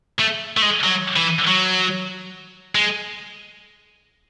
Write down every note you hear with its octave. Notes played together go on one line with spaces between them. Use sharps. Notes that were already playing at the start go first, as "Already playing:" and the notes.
A3
A3
G#3
F#3
E3
F#3
G#3